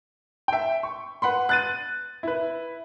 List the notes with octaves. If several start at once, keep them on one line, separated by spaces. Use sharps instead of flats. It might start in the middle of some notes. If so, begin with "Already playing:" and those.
E5 G5
C#6
B4 F#5 B5 C6
F#6 A6 D#7
E4 B4